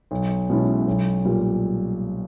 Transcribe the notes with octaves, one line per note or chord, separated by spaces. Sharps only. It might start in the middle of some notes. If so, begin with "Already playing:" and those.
B1
B2 G#3 C#4 E4
B1
A#2 G3